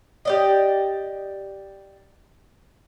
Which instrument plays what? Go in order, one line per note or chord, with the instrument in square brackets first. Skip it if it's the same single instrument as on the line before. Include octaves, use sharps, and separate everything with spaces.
[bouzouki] G4 D5 D#5